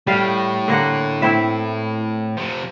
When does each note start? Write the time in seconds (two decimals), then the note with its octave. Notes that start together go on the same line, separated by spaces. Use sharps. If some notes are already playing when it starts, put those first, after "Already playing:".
0.07 A2 G3 F5
0.68 D3 A#3 F#5
1.22 C4 E4 E5
2.37 C3 F3